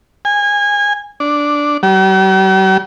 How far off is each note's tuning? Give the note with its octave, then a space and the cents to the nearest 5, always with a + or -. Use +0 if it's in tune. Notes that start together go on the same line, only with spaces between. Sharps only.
G#5 -25
D4 -5
G3 -45